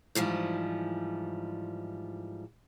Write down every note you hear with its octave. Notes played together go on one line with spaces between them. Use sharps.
G#2 E3 F3 G3